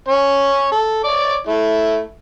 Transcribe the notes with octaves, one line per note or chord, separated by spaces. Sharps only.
C#4 C#5
A4
C#5 D5 D6
A3 E4